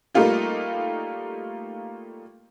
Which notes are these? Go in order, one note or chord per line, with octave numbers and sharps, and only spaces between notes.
G3 A3 A#3 D#4 F4 G4